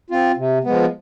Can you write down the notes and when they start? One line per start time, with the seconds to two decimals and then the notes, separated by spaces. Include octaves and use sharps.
0.10 C4 F4
0.37 C3
0.64 F3 G#3 B3